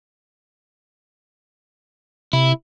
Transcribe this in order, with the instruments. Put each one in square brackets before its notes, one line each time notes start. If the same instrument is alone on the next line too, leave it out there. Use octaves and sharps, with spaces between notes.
[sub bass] C3 [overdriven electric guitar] E4